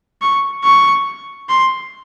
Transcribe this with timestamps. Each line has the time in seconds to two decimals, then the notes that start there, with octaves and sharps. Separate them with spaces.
0.22 C#6
0.64 C#6
1.49 C6